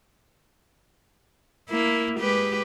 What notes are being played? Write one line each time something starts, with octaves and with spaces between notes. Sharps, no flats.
A#3 E4
G#3 G4 B4